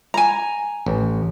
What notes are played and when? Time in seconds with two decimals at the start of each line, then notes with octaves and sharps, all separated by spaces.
0.14 G#5 A#5
0.86 A1